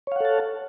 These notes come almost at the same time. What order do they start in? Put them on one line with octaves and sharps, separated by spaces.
C#5 F5 F#5 A4 A5